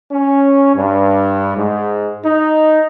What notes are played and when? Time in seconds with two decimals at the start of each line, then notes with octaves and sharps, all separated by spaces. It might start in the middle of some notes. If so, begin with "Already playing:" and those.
0.12 C#4
0.76 G2
1.56 G#2
2.25 D#4